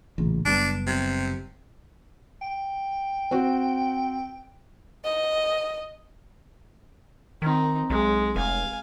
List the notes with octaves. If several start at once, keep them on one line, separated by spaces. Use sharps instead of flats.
A1 A#2 C#3
F#1 G3 B3 D4
C3
G5
C4 F#4
D#5
D#3 C4 D#4
B1 G#3
F1 F5 G#5